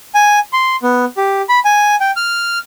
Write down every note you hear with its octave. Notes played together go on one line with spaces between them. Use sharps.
G#5
C6
B3
G4
B5
G#5
G5
F6